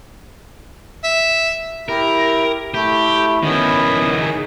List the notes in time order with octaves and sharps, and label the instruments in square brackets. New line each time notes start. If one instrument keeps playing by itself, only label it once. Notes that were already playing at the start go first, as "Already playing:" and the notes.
[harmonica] E5
[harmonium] E4 G4 [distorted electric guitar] A#4
[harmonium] A3 E4 [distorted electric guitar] G4
[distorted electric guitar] D#3 E4 [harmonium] B3 C#4
[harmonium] D#4 G#4